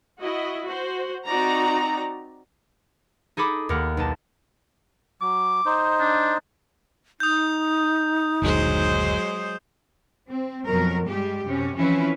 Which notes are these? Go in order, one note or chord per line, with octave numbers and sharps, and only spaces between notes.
E4 F#4 D#5
F#4 C5
C4 D#4 F#4 D5 A#5
D#4 G#4 A4 B5 D6 D#6
D#2 A#3 F#5 F6
B1 D#4 A5
F#3 D6
D#4 C5 D#5
D4
D#4 D#6 G6
F#1 D2 A#2 F#3 G#3 C5
C4
F2 B2 F#3 A#4
G2 G3 G#3 G4
F#2 C3 C#4
E3 F3 C4 C#4 E4 B4